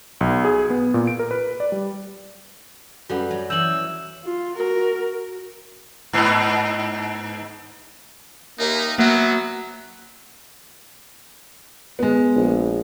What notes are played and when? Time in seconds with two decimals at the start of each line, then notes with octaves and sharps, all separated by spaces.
0.21 B1
0.44 G#4
0.70 B3
0.94 A#2
1.07 D7
1.19 A#4
1.31 B4
1.60 D5
1.72 G3
3.10 F#2 G3 F#4 A4 B4 F#5
3.31 F#3
3.50 E3 F#3 E6 G6 F#7
4.24 F4
4.55 F#4 A#4
6.13 G#2 B3 D#4
8.59 D#2 A#3 D#4 E5
8.98 F#3 A#3 B3 E5
11.99 G#3 B3
12.36 A#1